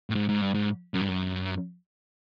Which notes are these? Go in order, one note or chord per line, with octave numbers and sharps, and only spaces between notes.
A2
G#2
G#2
G2
G#2
F#2
G2
F#2